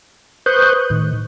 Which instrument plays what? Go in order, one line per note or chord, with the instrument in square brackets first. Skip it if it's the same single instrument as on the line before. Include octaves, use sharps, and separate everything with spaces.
[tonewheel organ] B4 C5 C#6 D#6 F#6 G6
A2 D#3